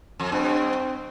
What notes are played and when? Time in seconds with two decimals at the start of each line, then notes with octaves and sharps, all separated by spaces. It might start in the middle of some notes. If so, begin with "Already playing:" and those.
0.20 F2
0.32 G2 C4